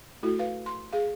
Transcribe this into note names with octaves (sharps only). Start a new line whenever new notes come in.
A3 E4 F#4 A4
B4 F5
C6
G#4 F5